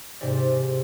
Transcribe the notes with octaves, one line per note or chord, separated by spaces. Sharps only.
G#2 C3 G4 D5